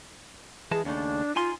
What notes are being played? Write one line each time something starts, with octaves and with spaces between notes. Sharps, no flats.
E3 G#3 G#4 A5
D#2 C#3 A3 D4
D#4 F4 G#5 C6